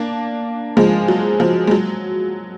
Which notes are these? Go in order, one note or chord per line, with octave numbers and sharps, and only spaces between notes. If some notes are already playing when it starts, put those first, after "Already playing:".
Already playing: A#3 D4
F3 G#3
F#3
F3
G#3
F#3